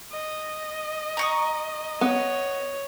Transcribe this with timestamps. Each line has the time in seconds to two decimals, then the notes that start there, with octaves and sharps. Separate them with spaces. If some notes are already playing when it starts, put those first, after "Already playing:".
0.11 D#5
1.17 A#5 C#6 D#6
2.01 B3 C#5